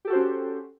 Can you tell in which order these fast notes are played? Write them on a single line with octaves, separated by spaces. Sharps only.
G4 A4 F#4 C5 C#4